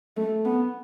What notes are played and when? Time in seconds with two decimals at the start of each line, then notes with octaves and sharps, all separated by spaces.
0.17 A3
0.45 B3